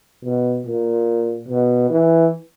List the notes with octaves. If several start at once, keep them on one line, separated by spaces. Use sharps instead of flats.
B2
A#2
B2
E3